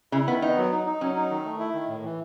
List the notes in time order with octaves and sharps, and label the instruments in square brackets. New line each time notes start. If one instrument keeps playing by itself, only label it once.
[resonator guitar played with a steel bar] C#3 [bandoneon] E4
[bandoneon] D#3 [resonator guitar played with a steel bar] B3
[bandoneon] B3 [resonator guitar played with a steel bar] D#4
[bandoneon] F#3
D#4
D#4
[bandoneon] F#3 [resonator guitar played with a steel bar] C#4
[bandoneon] D#4
D#3
A3
E4
D#3
A2
E3